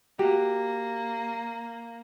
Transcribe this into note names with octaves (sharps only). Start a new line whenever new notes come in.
A#3 F#4 G4